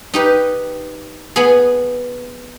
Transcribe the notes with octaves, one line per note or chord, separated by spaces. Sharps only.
D#4 G4 B4
B3 G#4